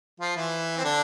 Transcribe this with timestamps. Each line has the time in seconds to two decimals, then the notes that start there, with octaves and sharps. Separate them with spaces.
0.20 F3 F4
0.36 E3 E4
0.77 C4
0.84 D3 D4